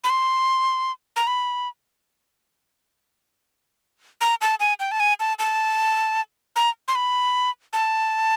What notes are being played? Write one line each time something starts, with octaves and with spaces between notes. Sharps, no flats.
B5
C6
A#5
B5
A#5
A5
G#5
G5
A5
G#5
A5
A5
A#5
C6
B5
A5